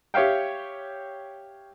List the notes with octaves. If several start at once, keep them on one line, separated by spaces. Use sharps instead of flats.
G4 C#5 E5 F5 G5